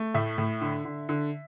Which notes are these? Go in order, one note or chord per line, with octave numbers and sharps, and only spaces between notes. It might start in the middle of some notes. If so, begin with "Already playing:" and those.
Already playing: A3
A2 E5
A2
D3
D3
D3